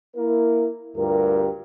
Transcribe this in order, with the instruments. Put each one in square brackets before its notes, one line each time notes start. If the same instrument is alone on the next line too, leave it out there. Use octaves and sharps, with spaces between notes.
[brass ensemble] A#3 E4 A#4
D2 G2 F4 G4 A#4